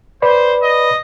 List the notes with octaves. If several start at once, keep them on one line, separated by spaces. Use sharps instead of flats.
B4 C5 D5 B5
D#5